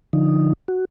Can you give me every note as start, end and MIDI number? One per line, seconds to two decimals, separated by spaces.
0.13 0.53 50
0.13 0.53 53
0.13 0.53 63
0.68 0.85 66